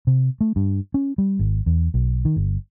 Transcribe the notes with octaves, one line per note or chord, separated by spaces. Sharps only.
C3
A3
G2
C#4
G3
G#1
E2
B1
D#3
G1